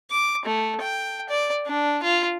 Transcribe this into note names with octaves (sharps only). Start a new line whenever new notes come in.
D6
A3
G5
D5
D4
F4